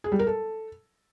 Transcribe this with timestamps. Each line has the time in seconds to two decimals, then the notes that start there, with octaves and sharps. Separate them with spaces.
0.04 G#4
0.12 G3
0.19 A#4
0.27 A4